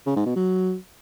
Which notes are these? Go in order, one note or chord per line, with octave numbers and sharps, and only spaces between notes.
C#3
G#2
B2
F#3